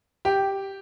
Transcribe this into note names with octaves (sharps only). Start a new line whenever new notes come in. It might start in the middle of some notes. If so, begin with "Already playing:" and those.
G4